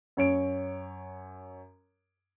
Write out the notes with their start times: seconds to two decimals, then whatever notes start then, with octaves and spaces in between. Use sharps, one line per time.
0.17 F#2 C#5 D7